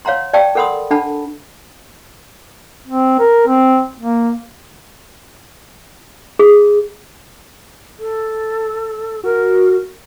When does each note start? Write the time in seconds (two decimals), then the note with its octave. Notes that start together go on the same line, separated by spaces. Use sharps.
0.05 C#5 F5 F#5 A#5 C6
0.33 D5 F5 G5 A5 C#6 E6
0.55 A4 A#4 F#5 B5 C6 D#6
0.91 D4 A4 F#5 A5 B5
2.88 C4
3.19 A#4
3.47 C4
3.99 A#3
6.39 G#4
7.99 A4
9.24 F#4 A#4